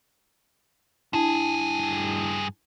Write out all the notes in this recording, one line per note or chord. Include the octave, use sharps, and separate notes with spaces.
G2 D4 E4 G#4 A5